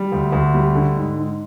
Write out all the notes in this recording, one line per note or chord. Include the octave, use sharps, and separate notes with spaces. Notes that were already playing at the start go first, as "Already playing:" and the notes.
Already playing: G3
D2
D2
G3
D3
G#2
G#2